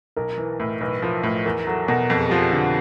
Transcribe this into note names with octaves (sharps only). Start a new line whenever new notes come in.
B1 A#4
E3
A2
B1 B4
F3 A#4
A2 B4
E2 A#4
F#3 A4
B2 A#4
F2 A4
G#4
F3 G4
G#4
D3